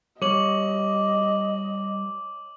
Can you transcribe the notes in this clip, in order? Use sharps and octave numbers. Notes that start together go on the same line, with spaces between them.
G3 C#5 D#5 D6 F#7